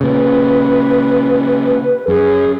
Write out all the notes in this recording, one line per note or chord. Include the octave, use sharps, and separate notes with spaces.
A#2 C#3 B4
F#2 G#4